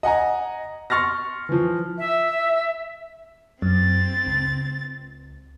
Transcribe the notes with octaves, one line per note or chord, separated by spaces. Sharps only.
D#5 F#5 G#5 A#5
C6 C#6 F6 A6 A#6
E3 F3
E5
F#2 C4 A6
C#2